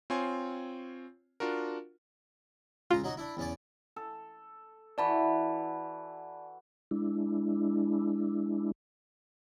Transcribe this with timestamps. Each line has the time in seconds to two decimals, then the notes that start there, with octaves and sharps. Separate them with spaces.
0.10 C4 F4 C#5 G#5 C6
1.40 D4 F4 F#4 A#4
2.91 C#2 C#3 F4 A#5
3.04 F#3 D#4 F#4
3.17 D4 E4
3.37 E2 C#4 D5
3.96 A4
4.98 E3 F#4 D5 A5 B5
6.91 G#3 D4 E4